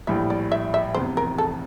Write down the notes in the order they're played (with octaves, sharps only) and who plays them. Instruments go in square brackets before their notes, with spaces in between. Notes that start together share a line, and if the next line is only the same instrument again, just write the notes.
[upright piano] A#1 A2 G3 [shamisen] E5
[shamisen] D5
E5
E5
[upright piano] F1 E2 C3 [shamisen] C5
[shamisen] A#4
A4